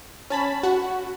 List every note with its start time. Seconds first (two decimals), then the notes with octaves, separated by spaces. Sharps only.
0.30 C#4 A5 B5
0.63 F#4